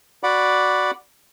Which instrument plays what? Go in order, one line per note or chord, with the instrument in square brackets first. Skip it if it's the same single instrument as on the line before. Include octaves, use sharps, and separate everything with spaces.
[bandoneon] F#4 D5 F#5 B5 D6